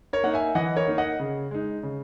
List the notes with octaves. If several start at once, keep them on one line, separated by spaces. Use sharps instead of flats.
A#4 C#5
A#3 D#4 F#5
E5 G#5
E3 D#5 F#5
A#4 C#5
A#3 D#4
D#5 F#5
C#3
G#3 D#4
C#3